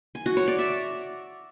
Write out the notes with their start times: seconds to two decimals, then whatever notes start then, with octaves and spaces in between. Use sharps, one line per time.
0.15 G#5
0.26 F#4
0.37 C#5
0.48 D5
0.59 E5